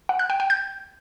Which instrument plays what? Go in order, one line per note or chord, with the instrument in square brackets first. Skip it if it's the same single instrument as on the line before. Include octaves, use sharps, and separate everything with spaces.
[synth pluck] F#5
F#6
G5
G5
G6